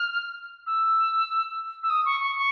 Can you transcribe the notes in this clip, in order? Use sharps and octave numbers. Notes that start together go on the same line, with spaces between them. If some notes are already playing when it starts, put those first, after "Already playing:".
Already playing: F6
E6
E6
D#6
C#6
C#6
C#6